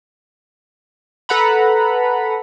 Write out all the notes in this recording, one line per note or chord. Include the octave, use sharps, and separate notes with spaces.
A4 B4 F#5 A#5 B5